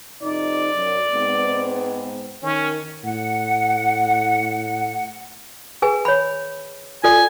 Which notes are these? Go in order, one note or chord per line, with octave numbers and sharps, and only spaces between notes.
F2 C3 D#4 D5
F#2
G#2 B3 C4
D#3 C#4
A2 F#5
G#4 B4 G#5
C#5 B5
F4 A4 D5 G#5